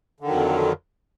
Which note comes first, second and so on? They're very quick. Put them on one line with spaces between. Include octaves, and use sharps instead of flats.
D3 D#3 F#3 F2